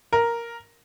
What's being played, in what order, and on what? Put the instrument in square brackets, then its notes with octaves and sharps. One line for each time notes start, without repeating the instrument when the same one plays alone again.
[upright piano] A#4